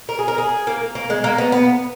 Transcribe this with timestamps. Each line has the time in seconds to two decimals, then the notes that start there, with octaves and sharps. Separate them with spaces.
0.09 A#4
0.19 G#4
0.28 A#4
0.38 G#4
0.67 A#3
0.95 A#3
1.10 G#3
1.24 A#3
1.38 B3
1.52 B3